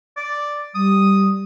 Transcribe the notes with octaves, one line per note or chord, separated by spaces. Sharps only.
D5
G3 D#6